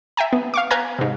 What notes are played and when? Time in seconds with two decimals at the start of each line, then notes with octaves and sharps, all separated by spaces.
0.17 E5 G5 G#5 A#5
0.33 B3
0.54 F5 C#6 D6
0.71 B4 F5 G#5 A#5 G6 G#6
0.99 G#2 C3